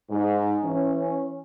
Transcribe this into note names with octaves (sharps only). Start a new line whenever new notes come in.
G#2
E3 C#4